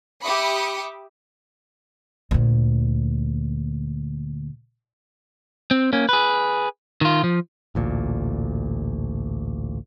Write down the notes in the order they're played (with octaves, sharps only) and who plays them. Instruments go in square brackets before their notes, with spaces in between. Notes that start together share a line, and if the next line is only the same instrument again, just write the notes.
[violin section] G4 E5 B5 D6 D#6 C#7
[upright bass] D2 A#2
[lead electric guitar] C4
A#3 C#4
G#4 B4
D#3 F4
F3
[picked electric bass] A1 D2 A#2